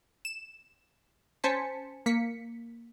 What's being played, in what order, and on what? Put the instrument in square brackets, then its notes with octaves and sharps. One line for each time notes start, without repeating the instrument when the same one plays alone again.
[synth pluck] E7
C#4 C5 G#5 A5 B6 C#7
A#3 B6 C#7